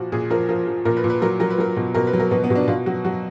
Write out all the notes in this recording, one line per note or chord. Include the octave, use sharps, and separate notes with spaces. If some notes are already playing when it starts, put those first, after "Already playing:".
Already playing: A#2 F3 F#4
A#2 G#4
F3 A#4
F3 A#4
F3
A#2 A#4
B4
A#2
B4
F#3 A#4
F#3 A#4
B4
F#3 A#4
B2
B2 A#4
B4
F#3
A#4
B2 B3
B3
B2
D4
B2 F4
F#3 F#4
F#3 F#4